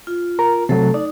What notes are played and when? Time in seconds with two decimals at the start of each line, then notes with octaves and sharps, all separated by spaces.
0.07 F4
0.39 A#4 A#5
0.69 C3 F#3 A3 A4
0.94 D#4 D5